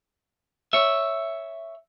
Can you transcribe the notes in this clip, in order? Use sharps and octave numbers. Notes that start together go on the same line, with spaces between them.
C#5 E5